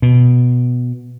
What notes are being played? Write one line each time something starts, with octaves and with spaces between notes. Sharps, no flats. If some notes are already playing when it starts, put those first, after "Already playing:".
B2